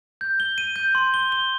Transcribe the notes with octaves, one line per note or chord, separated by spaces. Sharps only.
G6
G7
D#7
G6
C6
G7
G7